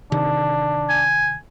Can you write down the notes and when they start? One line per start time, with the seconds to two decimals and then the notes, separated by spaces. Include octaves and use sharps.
0.12 C3 D#3 D4
0.89 G#5